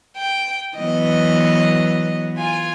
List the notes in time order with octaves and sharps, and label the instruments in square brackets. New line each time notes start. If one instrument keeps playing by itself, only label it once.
[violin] G5
[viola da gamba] E3 F#3 B3 [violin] D#5
[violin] F4 G#5